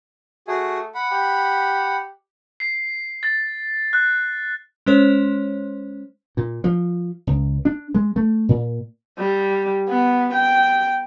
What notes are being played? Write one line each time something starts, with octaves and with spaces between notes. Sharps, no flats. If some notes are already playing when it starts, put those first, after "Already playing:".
A3 F#4 G#4 G#5
F#5 B5
G4
C7
A6
F#6
G#3 C#4 C5 C#5
A#2
F3
C#2
D4
G#3
A3
A#2
G3
B3
G5